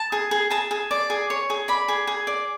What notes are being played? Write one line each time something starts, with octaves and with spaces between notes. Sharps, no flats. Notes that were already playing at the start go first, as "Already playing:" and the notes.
Already playing: A5
G#4
G#4
G#4 A5
G#4
D5
G#4
C#5
G#4
D5 B5
G#4
G#4
D5